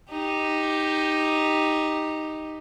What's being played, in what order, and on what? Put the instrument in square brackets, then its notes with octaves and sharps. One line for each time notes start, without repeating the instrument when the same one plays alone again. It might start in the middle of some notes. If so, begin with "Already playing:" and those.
[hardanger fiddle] D#4 G4